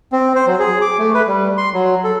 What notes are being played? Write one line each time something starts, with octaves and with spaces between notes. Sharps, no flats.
C4
C5
F#3
G#4
D6
A3
B4
G3
C6
F#3
A4